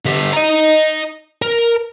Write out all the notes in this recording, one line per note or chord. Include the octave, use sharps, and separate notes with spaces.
D3 G4
D#5 A#5
A#4